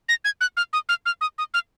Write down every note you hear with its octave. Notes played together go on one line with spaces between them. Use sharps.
A#6
G#6
F#6
F6
D#6
F6
F6
D#6
D#6
F6